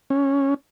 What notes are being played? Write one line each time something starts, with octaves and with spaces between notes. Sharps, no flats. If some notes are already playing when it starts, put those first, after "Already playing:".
C#4